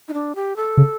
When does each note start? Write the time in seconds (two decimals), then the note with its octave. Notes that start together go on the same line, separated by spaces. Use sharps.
0.08 D#4
0.13 D4
0.35 G4
0.56 A4
0.77 C#3